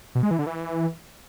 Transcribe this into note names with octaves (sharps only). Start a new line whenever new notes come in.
B2
G#3
E3
D3
E3